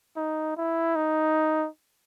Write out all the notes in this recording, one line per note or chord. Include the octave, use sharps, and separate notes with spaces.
D#4
E4
D#4